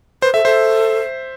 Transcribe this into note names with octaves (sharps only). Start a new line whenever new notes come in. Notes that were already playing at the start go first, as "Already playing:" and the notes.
B4 C5
A4 E5
A4 C5